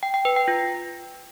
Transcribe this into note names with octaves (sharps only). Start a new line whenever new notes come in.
G5
G5
B4
G5
F4